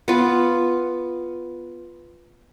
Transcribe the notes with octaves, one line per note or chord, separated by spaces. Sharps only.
B3 F4